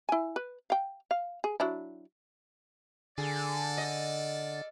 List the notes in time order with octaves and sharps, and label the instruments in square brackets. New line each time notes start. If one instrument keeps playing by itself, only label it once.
[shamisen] E4 G#5
B4
F5 G5
F5
G#4
F#3 D4 E4
[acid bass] D3 [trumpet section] F4 A4 D5 [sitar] G#4
[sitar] D#5